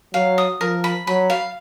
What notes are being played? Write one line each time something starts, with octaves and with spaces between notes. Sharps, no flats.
F#3 F5
D#6
F3 A#4
B5
F#3 B5
F5